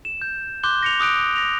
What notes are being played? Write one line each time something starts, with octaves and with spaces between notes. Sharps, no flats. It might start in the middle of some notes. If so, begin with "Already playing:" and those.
E7
G6
C6 D6 F#6 G6 G7
A#6 C#7 F7
D6 D#6 F#6 D7
A#6 F7